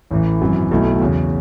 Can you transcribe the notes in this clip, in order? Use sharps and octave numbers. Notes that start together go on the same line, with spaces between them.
A1 A2 E3
G#1 F#2 E3
B1 B2 A3 E4
E2 C#3 F#3 C#4